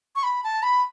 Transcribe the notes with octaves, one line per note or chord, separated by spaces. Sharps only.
C#6
B5
A5
B5